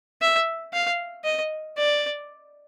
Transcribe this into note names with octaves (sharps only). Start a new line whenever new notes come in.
E5
F5
D#5
D5